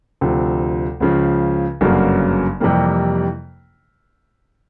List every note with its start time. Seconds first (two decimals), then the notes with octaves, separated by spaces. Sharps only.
0.21 D2 C3 F3
1.00 C#2 C#3 F3
1.81 G1 F#2 C#3 F#3 A#3
2.60 F2 C3 E3 G3 A#3